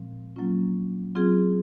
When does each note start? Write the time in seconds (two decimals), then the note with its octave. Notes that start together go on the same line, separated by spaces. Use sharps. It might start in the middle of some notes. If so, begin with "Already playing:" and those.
Already playing: A#2 F3 G#3 C4
0.36 F#3 A#3 C#4 F4
1.15 F#3 C4 F4 G#4